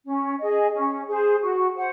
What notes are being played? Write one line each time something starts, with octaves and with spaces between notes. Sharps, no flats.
C#4
G#4 D#5
C#4
G#4 C5
F#4
C5 F#5